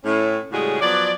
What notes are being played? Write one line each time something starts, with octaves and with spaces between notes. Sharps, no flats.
A2 A3 C#4
A2 C#3 G3 G#3 F#4 G#4
F3 F#3 B3 D5